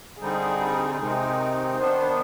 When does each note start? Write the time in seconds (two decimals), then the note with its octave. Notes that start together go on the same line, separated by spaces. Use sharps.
0.20 D3 G3 C4 D#4 G#4
0.99 C3 D#3 G#3 C4 D#4
1.77 D#3 B3 D4 C5